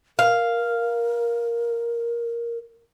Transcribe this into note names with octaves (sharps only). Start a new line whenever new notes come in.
A#4 F5